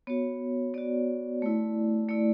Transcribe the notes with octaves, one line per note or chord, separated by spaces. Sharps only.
B3 F#4 C#5
B3 F#4 D5
A3 E4
A3 E4 D5